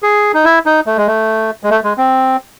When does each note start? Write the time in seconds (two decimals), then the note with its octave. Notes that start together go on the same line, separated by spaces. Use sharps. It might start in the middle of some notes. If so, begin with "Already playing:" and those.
0.03 G#4
0.34 D#4
0.44 E4
0.66 D#4
0.87 A3
0.97 G#3
1.07 A3
1.63 G#3
1.70 A3
1.84 G#3
1.98 C4